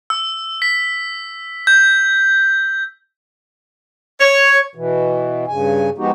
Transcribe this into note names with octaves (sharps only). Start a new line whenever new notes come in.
E6
B6
G6
C#5
B2 E3
G2 C#3 G#5
F3 G#3 B3 D#4 F#4 G4